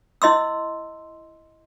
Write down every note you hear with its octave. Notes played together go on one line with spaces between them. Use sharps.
E4 D#5 C6 E6